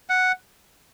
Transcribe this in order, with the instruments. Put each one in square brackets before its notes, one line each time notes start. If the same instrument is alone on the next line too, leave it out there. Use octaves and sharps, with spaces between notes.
[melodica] F#5